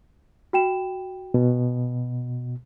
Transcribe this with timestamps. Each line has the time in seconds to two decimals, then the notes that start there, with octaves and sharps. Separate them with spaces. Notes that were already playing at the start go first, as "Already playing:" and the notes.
0.53 F#4 G5 E7
1.34 B2